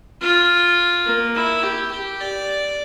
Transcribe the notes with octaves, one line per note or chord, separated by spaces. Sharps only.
F4
A#3
E4
G4
G4
D5